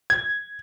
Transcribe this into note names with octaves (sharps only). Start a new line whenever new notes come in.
G#6